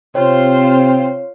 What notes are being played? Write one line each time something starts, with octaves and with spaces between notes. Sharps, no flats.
C3 C4 F4 C5 C#5 F5